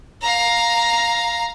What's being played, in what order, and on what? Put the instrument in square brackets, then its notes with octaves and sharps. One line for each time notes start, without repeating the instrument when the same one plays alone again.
[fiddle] F5 A#5